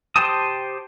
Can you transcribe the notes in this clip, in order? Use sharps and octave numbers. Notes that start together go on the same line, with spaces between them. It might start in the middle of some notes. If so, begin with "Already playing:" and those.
G4 C5 G5 A5 D#6